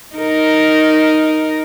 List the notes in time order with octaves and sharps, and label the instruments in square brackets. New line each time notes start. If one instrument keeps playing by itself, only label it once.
[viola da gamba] D#4 A#4